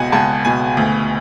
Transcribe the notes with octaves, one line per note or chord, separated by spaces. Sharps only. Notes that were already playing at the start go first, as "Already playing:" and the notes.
Already playing: C#2 B2 F#5 G#5
C#2 A5
B2 G#5
D2